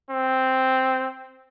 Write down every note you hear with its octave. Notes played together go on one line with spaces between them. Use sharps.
C4